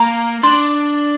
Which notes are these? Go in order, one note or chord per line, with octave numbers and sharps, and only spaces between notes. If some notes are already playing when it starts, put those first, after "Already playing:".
Already playing: A#3 A#5
D4 C6